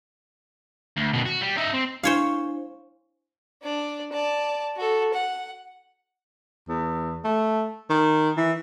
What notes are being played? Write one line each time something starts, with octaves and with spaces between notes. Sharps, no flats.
D2
B2 D#3
F#4
G3
D#4 E5
C4
D4 E4 C5 C#5 F5 G#5
D4 D5
D5 A5
F#4 A4
F#5
E2
A3
D#3
E3